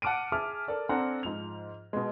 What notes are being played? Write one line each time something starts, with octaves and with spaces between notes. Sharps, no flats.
F#5 A5 D6 F6 D7 D#7
G#4 E5 A5 D6 F6
A4 A#4 D5
C4 D4 A4 F#5 G#5 A#5
G#2 F3 F7
B2 G#3